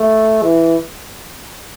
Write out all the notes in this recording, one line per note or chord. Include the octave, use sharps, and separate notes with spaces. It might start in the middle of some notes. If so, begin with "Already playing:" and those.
Already playing: A3
E3